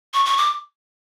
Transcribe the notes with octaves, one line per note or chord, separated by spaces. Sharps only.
C#6
C#6
D6